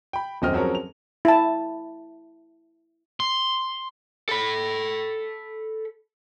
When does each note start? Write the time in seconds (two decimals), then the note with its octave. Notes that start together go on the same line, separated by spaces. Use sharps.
0.13 G5 B5
0.42 D#1 F#2 C4 D#5 G5 F6
0.54 F3 F#3 C4 C#4 G#4 A#4
0.75 F7
1.25 E4 A5
3.20 C6
4.29 A4 B5